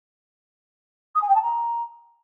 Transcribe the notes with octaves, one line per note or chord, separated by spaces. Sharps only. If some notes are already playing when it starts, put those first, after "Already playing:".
D#6
G#5
G5
A5
A#5